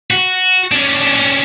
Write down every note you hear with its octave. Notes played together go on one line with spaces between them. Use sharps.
F#4
C#4 D4